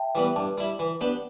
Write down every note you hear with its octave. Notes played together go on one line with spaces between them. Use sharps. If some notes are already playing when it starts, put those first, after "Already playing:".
Already playing: E5 G5 A5
E3 G3 B3
G2 A5 D6
G3 E4
E3
B3 D4 G4